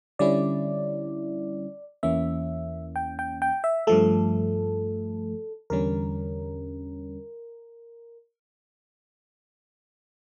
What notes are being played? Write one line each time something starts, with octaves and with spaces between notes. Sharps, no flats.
D3 G3 C#4 E4 D5
E2 E3 A#3 C#4 E5
G5
G5
G5
E5
G2 F3 A3 A4
E2 D3 G3 C#4 A#4